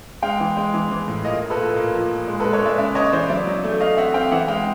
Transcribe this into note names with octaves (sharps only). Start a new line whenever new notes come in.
G#3 F5 G5
E3
G#3
E3
E3
A2
A#2 D#5 F5
A#2
A4 B4
A#2
A#2
F3
A#2
G#3
A4 B4
G#3
B4 C#5
G#3 D5 E5
C#3 D5 E5
C#3 C#5 D#5
E3 C5 D5
F#3 D5 E5
F#3
A3
A3 D#5 F5
C4 E5 F#5
C4 F5 G5
E3 E5 F#5
G#3 F5 G5